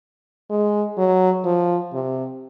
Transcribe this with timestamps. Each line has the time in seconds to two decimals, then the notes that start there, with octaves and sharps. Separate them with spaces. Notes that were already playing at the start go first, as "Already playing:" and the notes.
0.50 G#3
0.97 F#3
1.45 F3
1.93 C3